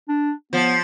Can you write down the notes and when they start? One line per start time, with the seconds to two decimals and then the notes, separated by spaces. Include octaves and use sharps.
0.09 D4
0.52 F3 B3